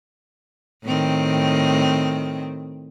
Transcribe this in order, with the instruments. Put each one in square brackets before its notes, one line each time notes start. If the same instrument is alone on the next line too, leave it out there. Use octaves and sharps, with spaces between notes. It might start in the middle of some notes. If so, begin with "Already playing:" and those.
[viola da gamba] A2 D#3 C4